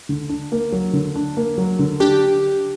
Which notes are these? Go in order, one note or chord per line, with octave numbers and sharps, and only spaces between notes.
D3
D4
A#3
F#3
D3
D4
A#3
F#3
D3
D4 G4